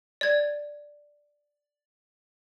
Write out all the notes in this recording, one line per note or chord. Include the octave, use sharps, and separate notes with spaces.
D5 G#6